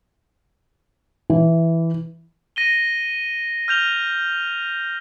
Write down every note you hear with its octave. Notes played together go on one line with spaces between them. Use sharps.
E3
A#6 D#7 G7
F6 G6 F7 G7